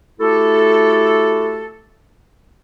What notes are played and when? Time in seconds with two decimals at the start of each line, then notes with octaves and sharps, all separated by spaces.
0.20 A3 E4 F#4 G4 A4